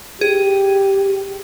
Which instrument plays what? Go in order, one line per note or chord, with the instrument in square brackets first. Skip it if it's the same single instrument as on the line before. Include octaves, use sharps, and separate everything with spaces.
[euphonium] G4 [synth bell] G#4